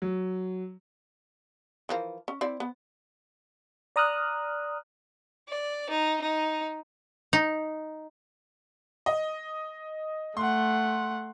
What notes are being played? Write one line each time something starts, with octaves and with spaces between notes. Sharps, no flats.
F#3
E3 F3 A#4
C#4
C4 E4 D5
B3
D5 A#5 D#6 F6 F#6
D5
D#4
D#4
D#4
D#5
A3 F#5 C6